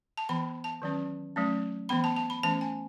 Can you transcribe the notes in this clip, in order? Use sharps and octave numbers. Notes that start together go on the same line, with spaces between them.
A5
E3 B3 B5
A5
D#3 F#3 C#4
F#3 A3 C#4
E3 B3 B5
A5
A5
B5
E3 A3 C#4 A5
G#5